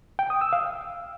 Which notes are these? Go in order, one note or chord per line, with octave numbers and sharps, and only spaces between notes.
G5
D#6
E6
F5